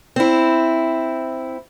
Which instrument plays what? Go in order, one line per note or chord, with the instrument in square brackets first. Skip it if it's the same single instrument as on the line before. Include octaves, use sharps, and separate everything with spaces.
[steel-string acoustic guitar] C4 E4